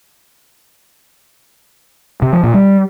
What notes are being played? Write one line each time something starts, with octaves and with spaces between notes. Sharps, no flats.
C3
F3
A#2
G3